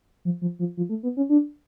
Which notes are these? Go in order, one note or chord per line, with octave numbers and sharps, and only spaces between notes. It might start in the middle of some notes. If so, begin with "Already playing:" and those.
F3
F3
F3
F3
A3
B3
C#4
D4